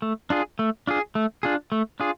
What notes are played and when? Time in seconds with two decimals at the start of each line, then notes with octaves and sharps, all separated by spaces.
0.02 A3
0.30 D4 F4 G#4
0.59 A3
0.87 D4 F4 G#4
1.15 A3
1.43 D4 F4 G#4
1.72 A3
2.00 D4 F4 G#4